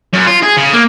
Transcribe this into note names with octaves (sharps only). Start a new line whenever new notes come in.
F#2
F4
G#4
C#3
A#3